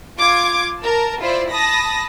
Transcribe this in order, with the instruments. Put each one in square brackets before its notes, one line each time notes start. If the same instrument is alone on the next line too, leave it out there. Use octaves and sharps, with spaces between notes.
[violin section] F4 D6 G#6
A#4 A5
E4 F4 C5 D5 E5
A5 B5 D#6 A#6